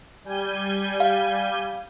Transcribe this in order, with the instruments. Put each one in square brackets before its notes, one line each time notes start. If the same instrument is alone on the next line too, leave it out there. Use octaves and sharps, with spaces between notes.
[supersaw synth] G3 G#5 G6
[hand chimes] F5